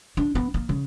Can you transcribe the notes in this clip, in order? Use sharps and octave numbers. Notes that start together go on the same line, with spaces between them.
D4
B3
A#3
C#3